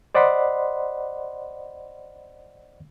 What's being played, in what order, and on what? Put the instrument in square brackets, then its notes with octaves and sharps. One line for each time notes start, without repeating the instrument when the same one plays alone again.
[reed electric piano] C5 D5 D#5 F#5 B5 C6